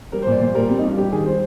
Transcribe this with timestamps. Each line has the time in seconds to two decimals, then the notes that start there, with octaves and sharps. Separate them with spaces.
0.12 G3 A#4
0.22 C5
0.27 A#2
0.32 D5
0.40 A#2 C5
0.54 G3 A#4
0.69 G3 C4
0.79 D#4
0.83 G2 F4
0.97 G3 G4
1.12 D#3 G#4
1.26 G3 C5